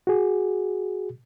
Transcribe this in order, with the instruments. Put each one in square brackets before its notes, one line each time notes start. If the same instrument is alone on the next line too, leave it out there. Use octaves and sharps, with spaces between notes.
[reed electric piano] F#4 G#4